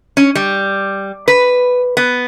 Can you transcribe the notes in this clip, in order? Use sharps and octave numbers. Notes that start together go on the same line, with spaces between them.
C#4
G3
B4
B3